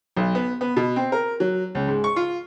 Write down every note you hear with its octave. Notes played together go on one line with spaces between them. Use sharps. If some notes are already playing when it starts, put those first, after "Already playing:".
B1
B3
B3
B2
C4
A#4
F#3
C#2
G#2
C#6
F4